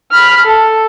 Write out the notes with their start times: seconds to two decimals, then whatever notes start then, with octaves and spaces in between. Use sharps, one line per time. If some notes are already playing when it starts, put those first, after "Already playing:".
0.11 B5 F6
0.44 A4